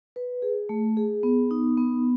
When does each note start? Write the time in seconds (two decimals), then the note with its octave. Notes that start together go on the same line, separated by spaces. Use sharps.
0.16 B4
0.42 G#4
0.69 A3
0.97 G#4
1.23 B3
1.51 D#4
1.77 B3